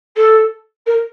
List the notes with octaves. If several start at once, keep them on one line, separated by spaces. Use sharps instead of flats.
A4
A#4